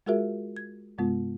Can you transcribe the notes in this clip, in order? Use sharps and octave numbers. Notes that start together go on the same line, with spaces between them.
G#3 F4 F#4 G#4 A#4 E5
G#6
G2 C3 G#3 B3 F4